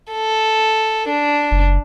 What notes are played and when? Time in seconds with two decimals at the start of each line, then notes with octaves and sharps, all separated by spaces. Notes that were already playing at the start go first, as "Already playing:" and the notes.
0.12 A4
1.08 D4
1.51 F#1